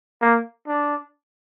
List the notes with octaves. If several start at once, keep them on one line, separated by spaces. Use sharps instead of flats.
A#3
D4